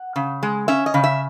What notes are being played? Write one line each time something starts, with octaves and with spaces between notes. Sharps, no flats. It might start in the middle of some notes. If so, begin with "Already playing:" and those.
Already playing: F#5
C#3
G#3
C#4 E5
D#5
C#3
E5